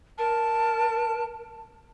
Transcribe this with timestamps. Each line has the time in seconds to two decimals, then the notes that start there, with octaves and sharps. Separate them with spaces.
0.18 A#4 A5